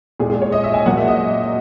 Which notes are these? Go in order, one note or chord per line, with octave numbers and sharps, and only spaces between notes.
A#2 G#3 G#4
G#4
C#5
D#5
E5
G#5
A#2 F#3 A#3 F#5
E5
D#5